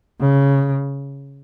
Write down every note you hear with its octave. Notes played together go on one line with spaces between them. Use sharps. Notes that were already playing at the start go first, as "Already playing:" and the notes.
C#3